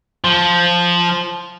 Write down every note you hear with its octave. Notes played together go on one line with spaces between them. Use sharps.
F3